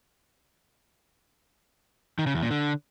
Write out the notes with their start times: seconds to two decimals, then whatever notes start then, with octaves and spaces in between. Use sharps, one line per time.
2.19 D#3
2.27 C#3
2.35 E2
2.43 A#2
2.51 D3